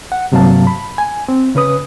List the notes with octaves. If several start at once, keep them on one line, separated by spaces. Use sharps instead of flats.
F#5
G2 C3 F#3 A#3 F5 A5
B5
G#5
C4
C#3 C#4 B4 D#6